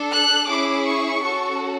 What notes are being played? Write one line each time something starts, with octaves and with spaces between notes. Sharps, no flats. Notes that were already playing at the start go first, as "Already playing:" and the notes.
Already playing: D4 A4
F#6
C#4 E4 G#4 D6
C#6
C#4 F#4 A4